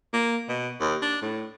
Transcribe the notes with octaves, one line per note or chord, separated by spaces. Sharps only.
A#3
B2
D#2
D4
A2